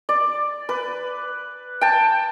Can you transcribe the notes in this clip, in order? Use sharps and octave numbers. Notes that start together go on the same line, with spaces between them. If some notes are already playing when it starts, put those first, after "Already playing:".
D5
B4
G5 A5